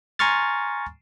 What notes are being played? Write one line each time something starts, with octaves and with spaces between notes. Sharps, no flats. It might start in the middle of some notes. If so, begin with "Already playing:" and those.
G#5 A#5 C6 C#6 F6 A6